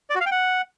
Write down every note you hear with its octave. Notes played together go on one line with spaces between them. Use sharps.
D5
F#4
F5
G5
F#5